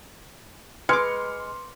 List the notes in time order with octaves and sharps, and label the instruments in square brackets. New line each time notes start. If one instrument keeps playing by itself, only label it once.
[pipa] G#3 [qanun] B4 D6 [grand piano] C6 F6 C#7